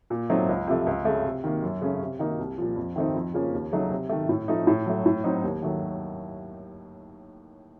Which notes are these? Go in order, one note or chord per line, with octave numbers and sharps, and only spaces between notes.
A#2
F#3 A3 C4 D#4
C#2
C3 F3 A3
C#2
C#3 A3
C3
D#3 A#3
F#2
C#3 A3 C#4
C3
D#3 A#3 D#4
C2
A#2 F3
F2
D#3 A3 C4 D#4
F2
C#3 F3 A#3 C#4
D#2
C#3 F#3 A3 D#4
C3
D#3 A3
A2
F3 A3 D#4
A2
F#3 A3
A2
F#3 C4 D#4
D#2
D#3 F#3 A3